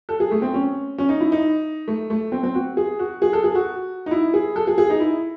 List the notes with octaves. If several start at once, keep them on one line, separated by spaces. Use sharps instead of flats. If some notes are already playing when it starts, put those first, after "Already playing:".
A4
G#4
A3
C4
C#4
C#4
D#4
E4
D#4
A3
A3
C4
C4
F#4
G#4
F#4
G#4
A4
G#4
F#4
D#4
E4
G#4
A4
G#4
G#4
D#4
E4